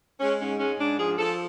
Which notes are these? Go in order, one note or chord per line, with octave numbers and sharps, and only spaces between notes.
G#3 C#4
G#2 C#4
G#3 C#4
G#2 D4
F3 G#4
F3 A4